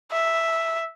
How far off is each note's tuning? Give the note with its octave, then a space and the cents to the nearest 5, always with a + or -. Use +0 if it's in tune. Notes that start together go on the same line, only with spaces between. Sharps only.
E5 +0